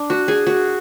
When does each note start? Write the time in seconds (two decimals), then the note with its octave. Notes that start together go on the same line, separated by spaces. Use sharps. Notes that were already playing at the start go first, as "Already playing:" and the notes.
Already playing: D4
0.10 F#4
0.28 G#4
0.47 F#4